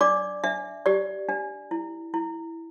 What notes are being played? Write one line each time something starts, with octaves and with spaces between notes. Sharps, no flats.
D4 D5 D6
D4 E5
G4 D5
D4
E4
E4